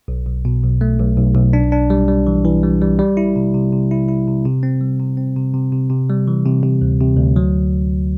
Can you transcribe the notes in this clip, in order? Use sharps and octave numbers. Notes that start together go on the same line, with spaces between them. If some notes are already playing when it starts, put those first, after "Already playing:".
B1
B1
B2
B1
A3
B1
B1
B1
D4
D4
G3
G3
E3
E3
G3
G3
G3
E4
C3
C3
C3
E4
E4
C3
C3
C4
G3
C3
C4
C3
C3
C3
C3
G3
E3
C3
C3
D2
C3
D2
F#3